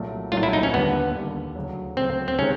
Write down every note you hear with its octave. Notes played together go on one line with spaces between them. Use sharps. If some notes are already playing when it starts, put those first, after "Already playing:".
Already playing: C2 A#2 F#3 A3
C2 A#2 F#3 A3 F4
E4
D#4
C#4
D#2 D3 G3 B3
D#2 D3 G3
D2 C#3 F#3
D2 C#3 F#3 C4
C4
C3 D#3 G#3 C#4